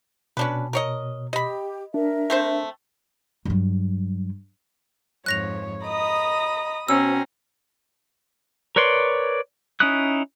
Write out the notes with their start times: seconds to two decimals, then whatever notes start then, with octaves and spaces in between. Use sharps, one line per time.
0.37 B2 C#4 D4 B4
0.73 A#4 C#5 D#5
1.33 G4 D#5 B5
1.94 D4 A#4 E5
2.30 A3 C4 C5
3.45 G2 F#3
5.26 F2 G#2 C#5 F#6 A#6 F7
5.86 D#5 A#5 B5 D#6
6.88 B2 C4 C#4 C5 A#5 E6
8.76 A#4 B4 C#5 D5 C6
9.80 C#4 D#4 E4 D#6 F#6